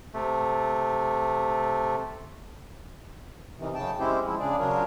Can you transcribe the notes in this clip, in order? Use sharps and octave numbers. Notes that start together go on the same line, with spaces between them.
C3 A3
C3 D#3 E3
F#2 C#3 G5 A5
G#3 C4 C#4 E4 G4 C5
F3 G#3 E4
C#3 D4 G#4 D5
C#3 F#3 D4 F4 A#4 C#5